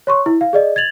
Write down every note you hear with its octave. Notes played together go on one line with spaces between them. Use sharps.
C#5 C6 C#6
E4
F5
G#4 D5 D#5
G#6 A6 F7 F#7